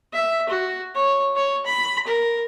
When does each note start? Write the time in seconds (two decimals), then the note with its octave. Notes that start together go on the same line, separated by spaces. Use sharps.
0.13 E5
0.49 F#4
0.95 C#5
1.36 C#5
1.66 B5
2.07 A#4